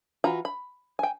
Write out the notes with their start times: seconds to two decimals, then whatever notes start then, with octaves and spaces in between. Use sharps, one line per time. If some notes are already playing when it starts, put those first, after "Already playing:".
0.24 E3 F4 F#4 A#5
0.45 B5
0.99 G5 G#5